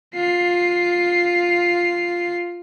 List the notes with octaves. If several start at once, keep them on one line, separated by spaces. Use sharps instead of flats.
F4 C7